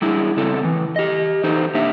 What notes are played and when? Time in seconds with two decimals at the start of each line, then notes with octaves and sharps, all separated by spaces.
0.02 G3 D4 E4 G#4
0.37 C#3 C4 E4 A4
0.63 A2 E3
0.96 G4 D#5
1.44 E3 D#4 A4 C5
1.75 A#3 D4 G4 E5